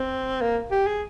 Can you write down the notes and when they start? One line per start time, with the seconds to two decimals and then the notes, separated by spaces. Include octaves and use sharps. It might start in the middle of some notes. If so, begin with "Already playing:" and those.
Already playing: C4
0.41 A#3
0.71 G4
0.87 G#4